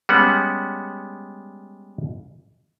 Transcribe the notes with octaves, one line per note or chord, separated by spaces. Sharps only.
G3 G#3 B3 C#4 F#5